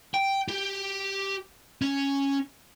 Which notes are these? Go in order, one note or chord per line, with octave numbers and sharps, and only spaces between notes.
G5
G4
C#4